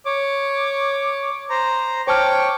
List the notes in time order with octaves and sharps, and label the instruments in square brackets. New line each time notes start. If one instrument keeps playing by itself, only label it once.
[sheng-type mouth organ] C#5 [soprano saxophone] D6
[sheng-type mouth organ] C5 A#5
[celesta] C5 A5 F6 [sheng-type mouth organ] C#5 G5 C#6 [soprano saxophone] D6